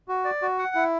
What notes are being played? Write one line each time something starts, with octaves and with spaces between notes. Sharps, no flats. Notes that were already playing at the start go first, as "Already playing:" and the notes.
F#4
D5
F#4
F#5
E4